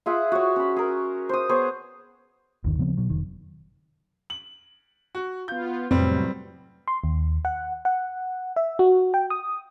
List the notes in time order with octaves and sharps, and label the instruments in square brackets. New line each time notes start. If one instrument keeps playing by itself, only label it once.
[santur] F4 G#4 E5 F#5
F#4 C#5
C#4 B5
G#4 A#4
C5 D#6
B3 G#4 C5 C#5
[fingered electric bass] G1 D#2 D#3
C#3 F3 B3 C4
B2 F#3
F1 D#3
[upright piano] F#7
F#4
[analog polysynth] B3 F4 [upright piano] G6
[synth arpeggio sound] F2 [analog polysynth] A2 C3 F#3 [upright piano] G3 B3 C4
[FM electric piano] C6
D#2
F#5
F#5
E5
F#4
G5
D#6